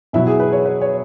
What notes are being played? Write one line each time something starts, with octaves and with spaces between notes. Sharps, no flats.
B2 F#3 E4
G#4
B4
C#5
B4
C#5